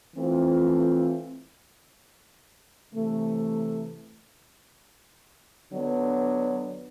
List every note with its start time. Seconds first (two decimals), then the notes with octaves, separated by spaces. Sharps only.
0.16 E3 A3 C4 F4
2.94 C3 E3 A3
5.72 D3 F#3 B3 D4